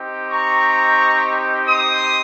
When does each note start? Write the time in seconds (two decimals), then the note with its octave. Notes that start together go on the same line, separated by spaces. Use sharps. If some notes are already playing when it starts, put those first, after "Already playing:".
Already playing: C4 D#4 G4
0.30 A#5 C#6
1.67 C6 D#6